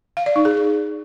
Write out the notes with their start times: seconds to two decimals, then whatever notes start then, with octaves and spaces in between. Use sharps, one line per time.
0.17 F5
0.26 D5
0.36 D#4
0.45 G#4